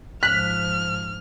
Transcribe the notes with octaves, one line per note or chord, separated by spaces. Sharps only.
G#2 F3 F6 F#6 B6